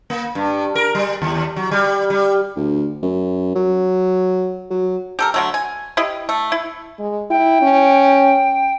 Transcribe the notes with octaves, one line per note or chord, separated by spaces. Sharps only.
A#3
G2
A#4
G3
D#2
F#3
G3
G3
D2
F#2
F#3
F#3
G4 A4 A#4
D3 F#3 A3
G#5
E4 G4 D#5
A3
E4
G#3
E4 G5
C#4